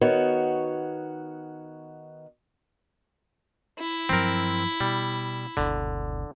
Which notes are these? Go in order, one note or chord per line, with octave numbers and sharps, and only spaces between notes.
D#3 B3 F#4 C#5
E4
G2 F3 F#3 C4 A#4
B2 G3
F#1 D2 B2 D3